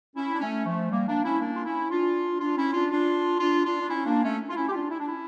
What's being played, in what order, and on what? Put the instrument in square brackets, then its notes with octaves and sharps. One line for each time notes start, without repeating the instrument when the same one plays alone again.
[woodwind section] C#4 E4
D4
A3 C#4
F3 A3
G3 A#3
A#3 D4
C#4 E4
A#3 D4
F4
C#4 E4
D4 F4
D4 F4
C#4 E4
D4 F4
D4 F4
D4 F4
D4 F4
D4
C#4 E4
A#3 D4
A3 C#4
F4
C#4 E4
G4
D4 F4
E4
D4
C#4 E4